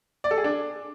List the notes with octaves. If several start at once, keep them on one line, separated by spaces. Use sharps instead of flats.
D5
A4
G#4
D4